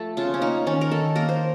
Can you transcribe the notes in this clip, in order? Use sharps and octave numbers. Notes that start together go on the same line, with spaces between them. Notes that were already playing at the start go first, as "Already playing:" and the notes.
Already playing: F3 A3 A4
C#3 F4
C#4
A#3 D#4
D#3 C#4
A#4
D#3 A4
A#3 A#4
C5